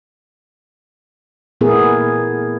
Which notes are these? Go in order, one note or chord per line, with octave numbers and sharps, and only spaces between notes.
A#2 A3 B3 E4 G#4 A#4